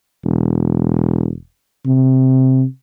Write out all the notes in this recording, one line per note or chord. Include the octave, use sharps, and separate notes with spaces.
E1
C3